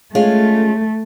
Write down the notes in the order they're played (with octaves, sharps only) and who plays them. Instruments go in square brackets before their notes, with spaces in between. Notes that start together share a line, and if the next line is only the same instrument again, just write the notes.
[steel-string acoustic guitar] G#3 C#4 F4 [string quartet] A3